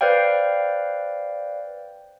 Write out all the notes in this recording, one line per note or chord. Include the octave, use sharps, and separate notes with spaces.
B4 C5 D5 F5 G5